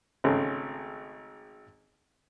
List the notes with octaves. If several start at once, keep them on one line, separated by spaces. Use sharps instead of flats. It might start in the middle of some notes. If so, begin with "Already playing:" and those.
G#1 C#3 G#3 A3